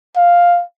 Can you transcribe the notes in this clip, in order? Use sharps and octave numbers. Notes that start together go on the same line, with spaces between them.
F5